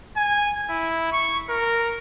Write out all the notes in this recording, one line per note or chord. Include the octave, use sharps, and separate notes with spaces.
G#5
E4
C#6
A#4